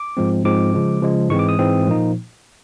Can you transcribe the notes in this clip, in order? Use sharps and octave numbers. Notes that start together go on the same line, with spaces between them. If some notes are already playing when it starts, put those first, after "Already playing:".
Already playing: D6
G#2 F3 G#3 C4
G#2 F3 G#3 C4 D6
C#3 F3 G#3
C#3 F3 G#3
G#2 E3 G#3 C4 C#6
D6
D#6
G#2 E3 G#3 C4
A#2 F3 A#3 D#4